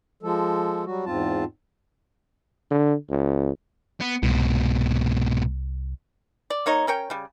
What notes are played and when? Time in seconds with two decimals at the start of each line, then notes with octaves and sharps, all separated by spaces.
0.23 F3 G#3 A4
0.86 F#3 G3 F#4
1.05 E2 G#2 C4 F4 A5
2.71 D3
3.10 C#2
4.01 B3
4.23 C2 G#2 B2
6.50 D5
6.66 A#3 D#4 C#5 D#5
6.87 C#4 A#4 C#5 G5
7.10 C#3 G3